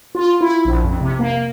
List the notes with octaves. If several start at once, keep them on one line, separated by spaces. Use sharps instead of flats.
F4
E4
A#1
F2
C3
A#3